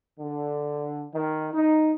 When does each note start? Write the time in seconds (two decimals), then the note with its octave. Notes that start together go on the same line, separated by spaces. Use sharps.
0.20 D3
1.14 D#3
1.54 D#4